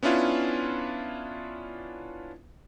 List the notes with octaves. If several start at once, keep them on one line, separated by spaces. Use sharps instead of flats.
B3 C#4 D4 E4 F4